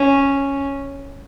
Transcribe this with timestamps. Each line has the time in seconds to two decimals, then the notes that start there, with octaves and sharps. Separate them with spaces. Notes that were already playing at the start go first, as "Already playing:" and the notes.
Already playing: C#4